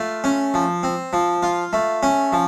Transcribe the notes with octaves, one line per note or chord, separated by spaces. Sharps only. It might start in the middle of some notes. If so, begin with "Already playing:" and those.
Already playing: A3 F4
C#4
F3
C4
F3
F4
A3
C#4
F3